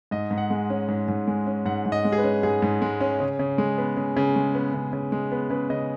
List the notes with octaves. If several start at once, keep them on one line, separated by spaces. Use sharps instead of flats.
G#2 D#5
G#2
F#5
G#3
C#4
G#2
G#2
G#3
C#4
G#2 F#5
G#2
D#5
G#3
G#4
B4
C#4
G#2 G#4
G#2
G#3
C#4
C#3
C#3
G#3
B3
C#3
C#3
G#3
B3
C#3
C#3
G#3
B3
C#3 B4
C#3 D#5